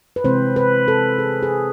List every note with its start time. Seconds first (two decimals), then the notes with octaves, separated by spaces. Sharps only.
0.16 B4
0.24 C3 E3 G#3 C4 C5
0.56 B4
0.88 A4
1.18 G#4
1.43 G#4